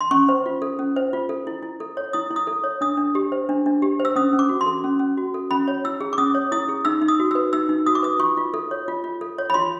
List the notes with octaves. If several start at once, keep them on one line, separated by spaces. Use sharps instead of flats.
C6
C#4 C#6
C5
F4
A4
C#4
C5
F4
A4
E4
E4
A4
C#5
E4 D#6
E4
D#6
A4
C#5
D4 D#6
D4
G4
C5
D4
D4
G4
C5
E6
C#4 D#6
C#4
D6
F#4
C6
A4
C#4
C#4
F#4
A4
C#4 B5
C#5
E4 E6
G#4
D6
C#4 D#6
C#5
E4 D#6
G#4
D#4 E6
D#4
D#6
F#4
B4 E6
D#4 E6
D#4
F#4 D#6
D6
B4 D#6
F4 C#6
F4
A4
C#5
F4
F4
A4
C#5
B5
F4 C6